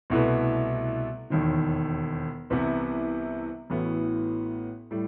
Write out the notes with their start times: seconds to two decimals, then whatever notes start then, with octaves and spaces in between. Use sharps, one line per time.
0.10 C2 B2 A3 E4 B4
1.30 E1 D#2 D#3
2.50 C2 C3 E3 B3 E4
3.70 A1 A2 E3 B3 F#4
4.91 A2 G3